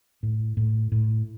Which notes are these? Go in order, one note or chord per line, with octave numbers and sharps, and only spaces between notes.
A2
A2
A2